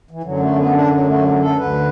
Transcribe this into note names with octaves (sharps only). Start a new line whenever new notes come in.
E3
F#2 D3 F#3
A3
B3
D4
F#3
A3
F#3
A4
D2 D3 B4